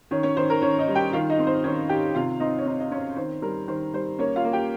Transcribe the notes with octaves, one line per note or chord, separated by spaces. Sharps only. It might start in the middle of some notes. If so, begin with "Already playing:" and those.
D#3 C#4 C#5
C#4 C#5
D#3 C5
A#4
D#3 C#4 C#5
D#4 D#5
G3
G4 G5
D#3 F4 F5
D#4 D#5
C4
C5
D#3 C#4 C#5
D#3 G4 G5
C3 F4 F5
C4 D#4 D#5
C#5
C4 D#4 D#5
D#5
C4 C#4 C#5
D#3 C5
G3 A#4
D#3 C5
G3 C5
A#3 C#4 C#5
F4 F5
A#3
G4 G5